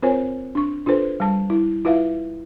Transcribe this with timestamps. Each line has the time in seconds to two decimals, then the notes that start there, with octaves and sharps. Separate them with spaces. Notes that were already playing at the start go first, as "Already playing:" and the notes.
0.02 C4 F4 A#4 C5 C#5 G#5
0.55 D4 C#6
0.86 D4 F4 A4 B4 C5
1.20 G3 A5
1.50 E4
1.85 E4 F4 B4 E5 F5